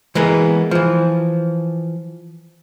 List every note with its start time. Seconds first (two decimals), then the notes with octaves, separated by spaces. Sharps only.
0.15 E3 G#3 A#3 B3
0.71 E3 F3